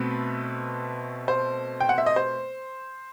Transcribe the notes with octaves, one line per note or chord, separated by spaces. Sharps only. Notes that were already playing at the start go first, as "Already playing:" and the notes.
Already playing: B2 A3 C4 B4
C5
G5
F#5
E5
D#5
C5